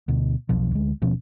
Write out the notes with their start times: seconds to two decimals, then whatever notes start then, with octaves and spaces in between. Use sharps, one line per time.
0.08 D2 B2
0.49 E1 B1 B2 F3
0.71 D2 G#3
1.02 D#1 B2 F3 C#4